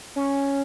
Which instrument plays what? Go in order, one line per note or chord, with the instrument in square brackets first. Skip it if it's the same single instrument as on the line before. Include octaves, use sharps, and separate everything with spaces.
[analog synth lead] C#4